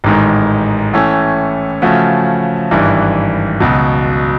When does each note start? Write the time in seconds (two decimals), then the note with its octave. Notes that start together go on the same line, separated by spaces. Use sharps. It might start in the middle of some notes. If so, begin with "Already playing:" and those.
0.04 A1 G#2 D#3 G#3
0.93 A2 E3 A3 C#4
1.82 C#3 F3 A3 C#4 F#4
2.71 G#1 G2 E3
3.60 C#2 B2 F#3